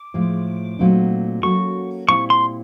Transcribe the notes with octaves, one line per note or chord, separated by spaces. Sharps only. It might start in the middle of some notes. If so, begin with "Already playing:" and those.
Already playing: D6
A2 F3 G#3
A#2 F#3 A3 C4 D#4
F#3 A#3 C#4 F#4 A4 C#6
A#2 G3 C4 E4 C#6
C6